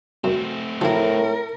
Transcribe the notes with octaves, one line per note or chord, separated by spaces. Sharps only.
F#2 A3 C4
A2 F3 E4 A#4